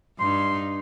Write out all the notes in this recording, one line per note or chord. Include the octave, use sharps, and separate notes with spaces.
G2 D#4 C6